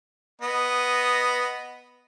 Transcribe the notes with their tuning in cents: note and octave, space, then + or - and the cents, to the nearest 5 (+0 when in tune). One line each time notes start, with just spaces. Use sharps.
B3 +0 D#5 -5